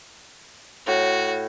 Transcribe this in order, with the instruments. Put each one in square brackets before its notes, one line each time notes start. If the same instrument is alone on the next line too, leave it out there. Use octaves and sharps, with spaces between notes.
[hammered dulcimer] A2 [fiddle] F#4